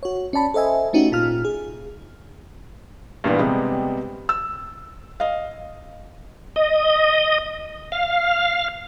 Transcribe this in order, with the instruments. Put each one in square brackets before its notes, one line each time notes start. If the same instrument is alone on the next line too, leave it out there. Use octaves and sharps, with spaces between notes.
[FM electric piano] F#4 C#5
C#4 D5 A5 B5
A4 C5 D#5 E5 G#5
A3 C#4 D#4 F#4 G4
G#1 A#2 F4 F6
G#4
[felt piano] G2 A#2 E3 B3
C3 G3 G#3 B3 C4
E6
D#5 F5
[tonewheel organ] D#5
F5